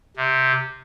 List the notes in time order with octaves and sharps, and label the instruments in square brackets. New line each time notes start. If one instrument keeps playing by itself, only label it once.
[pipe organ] C3